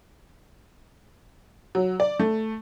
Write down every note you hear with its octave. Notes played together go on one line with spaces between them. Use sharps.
F#3
D5
A3